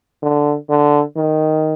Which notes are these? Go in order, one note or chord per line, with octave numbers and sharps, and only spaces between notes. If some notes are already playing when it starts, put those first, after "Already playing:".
D3
D3
D#3